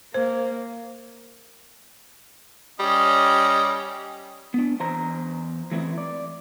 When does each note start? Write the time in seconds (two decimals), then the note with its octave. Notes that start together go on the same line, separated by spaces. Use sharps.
0.14 A#3 C5
2.80 G3 C#4 D#5
4.54 B3 D4
4.80 E2 C5 A#5
5.71 E3 A3 C4 E4
5.98 D5